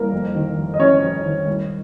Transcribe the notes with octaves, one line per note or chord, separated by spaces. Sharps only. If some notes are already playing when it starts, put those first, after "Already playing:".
Already playing: C2 A#3 A#4
F2
D#3
F2
D#5
F2 C#4 C#5
F2
D#3
C2